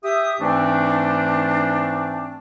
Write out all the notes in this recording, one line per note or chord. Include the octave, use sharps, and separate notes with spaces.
G4 E5 D#6
G#2 E3 A3 C4 D4